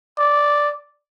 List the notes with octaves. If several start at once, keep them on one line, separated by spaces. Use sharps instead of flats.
D5